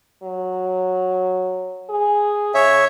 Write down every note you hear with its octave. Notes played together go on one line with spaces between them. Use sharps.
F#3
G#4
C#3 C#5 E5